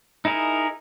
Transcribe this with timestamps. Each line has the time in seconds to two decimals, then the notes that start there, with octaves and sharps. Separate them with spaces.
0.25 D#4 E4 G#4 A#4